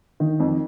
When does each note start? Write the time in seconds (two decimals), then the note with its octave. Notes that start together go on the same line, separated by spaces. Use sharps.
0.20 D#3
0.40 F2